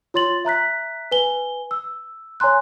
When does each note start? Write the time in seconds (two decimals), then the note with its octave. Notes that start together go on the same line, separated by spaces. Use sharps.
0.14 F4 C#5 C6 A6 F#7
0.45 E5 A#5 F#6 B6
1.12 B4 G#5 G7
1.71 E6
2.40 C#5 G#5 A#5 C6 F#6